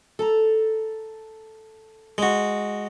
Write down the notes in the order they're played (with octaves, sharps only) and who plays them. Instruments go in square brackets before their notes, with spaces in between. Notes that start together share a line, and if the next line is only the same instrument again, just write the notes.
[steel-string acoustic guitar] A4 A5 A#5
[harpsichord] G#3 F#4